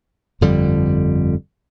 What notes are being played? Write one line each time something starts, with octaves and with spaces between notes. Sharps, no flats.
G1 F2 D3 G3